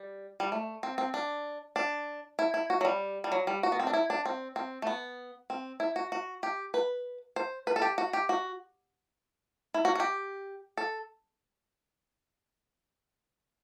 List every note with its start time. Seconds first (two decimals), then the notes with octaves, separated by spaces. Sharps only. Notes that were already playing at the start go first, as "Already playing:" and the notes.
Already playing: G3
0.40 G3
0.52 A3
0.83 C4
0.98 C4
1.14 D4
1.76 D4
2.39 E4
2.54 E4
2.70 F#4
2.81 F#3
2.85 G3
3.24 G3
3.32 F#3
3.47 G3
3.63 F#4
3.72 B3
3.80 C4
3.87 D4
3.93 E4
4.10 D4
4.25 C4
4.56 C4
4.82 A3
4.87 B3
5.50 C4
5.80 E4
5.96 F#4
6.12 F#4
6.43 G4
6.74 B4
7.36 C5
7.67 B4
7.76 A4
7.82 G4
7.98 F#4
8.13 G4
8.29 F#4
9.74 E4
9.85 F#4
9.95 F#4
10.00 G4
10.77 A4